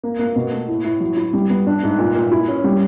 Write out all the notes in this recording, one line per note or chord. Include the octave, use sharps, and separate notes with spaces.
A#3
A#3
B2
A3
A2
A2
F#3
E4
G3
B3
D4
G#2
A#2
A#2
E4
C#4
G3